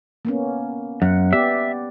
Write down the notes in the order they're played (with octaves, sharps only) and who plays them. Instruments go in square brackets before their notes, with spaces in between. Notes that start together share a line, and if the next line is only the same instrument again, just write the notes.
[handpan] A#3 B3 C#4
[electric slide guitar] F#2 [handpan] F#5
[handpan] B3 G4 D5 [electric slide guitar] E5